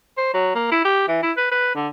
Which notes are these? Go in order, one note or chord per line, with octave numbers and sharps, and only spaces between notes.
C5
F#3
A#3
E4
G4
E3
E4
B4
B4
D3